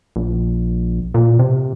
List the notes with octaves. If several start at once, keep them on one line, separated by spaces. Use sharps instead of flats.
A#1
A#2
C3